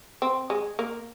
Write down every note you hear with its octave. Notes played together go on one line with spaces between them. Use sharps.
C4
G#3
A#3